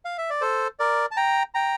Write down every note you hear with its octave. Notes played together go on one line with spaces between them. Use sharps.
F5
E5
D5
A4 C5
A#4 D5
A5
G5 A#5
G5 A#5